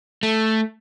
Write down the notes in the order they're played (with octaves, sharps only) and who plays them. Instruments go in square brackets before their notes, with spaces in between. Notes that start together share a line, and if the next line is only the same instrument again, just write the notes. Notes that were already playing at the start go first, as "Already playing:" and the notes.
[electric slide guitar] A3